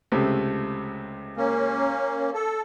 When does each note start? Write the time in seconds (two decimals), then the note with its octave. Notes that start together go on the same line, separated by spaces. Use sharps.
0.12 C#2 C3 A3
1.37 A#3 C#4
2.34 A4